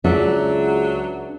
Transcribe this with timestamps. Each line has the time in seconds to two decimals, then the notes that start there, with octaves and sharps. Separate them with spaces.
0.04 C#2 F#3 D4 E5